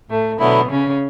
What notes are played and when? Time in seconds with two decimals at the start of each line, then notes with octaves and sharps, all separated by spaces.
0.10 A2 A3
0.39 B2 D3 F#3 A3 B3 E4
0.70 C#3 C#4